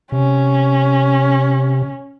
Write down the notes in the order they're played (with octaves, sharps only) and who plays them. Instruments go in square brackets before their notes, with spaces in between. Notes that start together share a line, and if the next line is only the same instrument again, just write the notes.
[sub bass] C3 [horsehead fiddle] C#4